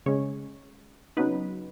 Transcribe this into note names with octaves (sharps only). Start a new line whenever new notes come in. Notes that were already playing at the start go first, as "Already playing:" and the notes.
C#3 G#3 C#4 C#5
C#3 F#3 B3 D#4 B4